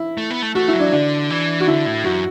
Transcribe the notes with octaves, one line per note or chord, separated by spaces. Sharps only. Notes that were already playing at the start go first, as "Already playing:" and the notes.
Already playing: E4
A3
B3
A3
A3 F#4
E4
F#3
D4
D3 D4
E3
F#4
D3 E4
A2
F#2 F#4